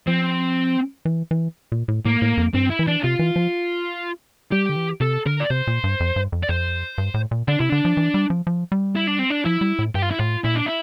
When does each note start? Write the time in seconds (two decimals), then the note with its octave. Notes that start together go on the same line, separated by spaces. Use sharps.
0.07 F3 C4
1.05 E3
1.31 E3
1.72 A#2
1.88 A2
2.05 A2 A#3
2.22 A2
2.37 F2
2.54 G2 C4
2.70 E4
2.79 E3
2.87 D4
3.04 C3 F4
3.19 E3
3.36 F3
4.52 G3 G4
4.69 D3
4.76 E3
5.00 C3 A4
5.26 D3 A#4
5.40 D5
5.50 C3 C5
5.67 A#2
5.84 G2
6.00 F2
6.16 G2
6.32 F2
6.43 D5
6.49 F2 C5
6.98 G2
7.14 A2
7.31 A#2
7.48 D3 D4
7.59 C3 E4
7.69 D3 D4
7.85 F3
7.97 E3
8.14 G3
8.30 F3
8.47 F3
8.72 G3
8.95 E4
9.07 D4
9.19 C4
9.30 D4
9.45 F3 E4
9.61 G3
9.79 A2
9.95 G2 G4
10.02 F4
10.11 E4
10.19 A2 F4
10.44 A#2 E4
10.55 D4
10.66 E4